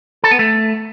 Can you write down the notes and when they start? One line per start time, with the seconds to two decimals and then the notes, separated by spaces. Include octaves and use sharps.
0.24 A4
0.31 B3
0.39 A3